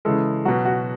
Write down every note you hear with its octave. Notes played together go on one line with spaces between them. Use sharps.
C#3 E3 G#3 A4
B2 F#3 F#4
F#4